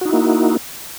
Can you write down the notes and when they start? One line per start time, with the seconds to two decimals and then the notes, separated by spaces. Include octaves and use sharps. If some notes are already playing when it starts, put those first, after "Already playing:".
0.01 F#4
0.05 D#4
0.09 E4
0.13 A#3